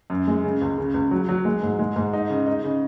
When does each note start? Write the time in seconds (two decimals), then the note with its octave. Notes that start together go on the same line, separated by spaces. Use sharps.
0.10 F#2
0.28 G#3
0.44 C#3
0.62 C#2
0.78 C#3
0.94 C#2
1.11 F#3
1.29 F#3
1.45 G#3
1.63 G#2
1.79 G#3
1.96 G#2
2.13 D#4
2.30 C#3
2.46 D#4
2.64 C#3